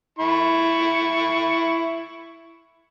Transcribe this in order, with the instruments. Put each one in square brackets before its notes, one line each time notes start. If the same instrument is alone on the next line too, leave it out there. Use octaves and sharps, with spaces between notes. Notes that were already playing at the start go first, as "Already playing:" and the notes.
[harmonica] E4 C#6